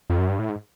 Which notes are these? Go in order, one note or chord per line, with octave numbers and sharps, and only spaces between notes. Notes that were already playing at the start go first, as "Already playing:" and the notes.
F2
F#2
G2
A2
G#2